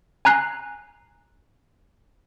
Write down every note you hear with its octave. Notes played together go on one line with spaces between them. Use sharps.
G#5 A#5 F#6 C7